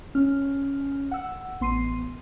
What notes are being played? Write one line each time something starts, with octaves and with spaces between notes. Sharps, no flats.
C#4 F6
F#5 E6
A1 B3 C6 C7 D#7